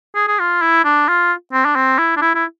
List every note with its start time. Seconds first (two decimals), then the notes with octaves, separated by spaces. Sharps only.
0.15 G#4
0.28 G#4
0.39 F4
0.62 E4
0.85 D4
1.08 F4
1.53 C4
1.65 D4
1.76 C4
1.99 E4
2.17 D4
2.22 E4
2.35 E4